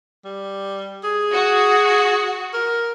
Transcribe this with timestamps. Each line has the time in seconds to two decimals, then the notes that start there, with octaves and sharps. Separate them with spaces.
0.25 G3
1.04 G#4
1.34 F#4
2.54 A#4